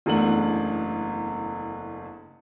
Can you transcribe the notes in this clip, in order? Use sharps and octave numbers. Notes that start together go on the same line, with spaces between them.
F#1 E2 A3 D4 F#5 F#7